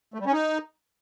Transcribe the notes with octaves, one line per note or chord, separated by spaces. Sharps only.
A3
G3
C#4
D#4